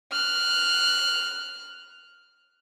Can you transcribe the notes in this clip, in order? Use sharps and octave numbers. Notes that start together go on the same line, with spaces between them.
F6 F#6